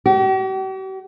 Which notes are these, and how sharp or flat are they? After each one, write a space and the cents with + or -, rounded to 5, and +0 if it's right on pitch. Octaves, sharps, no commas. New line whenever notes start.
G4 -45